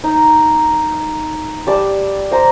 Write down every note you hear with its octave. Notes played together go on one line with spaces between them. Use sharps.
D#4
G3 D5 A5
C5 A#5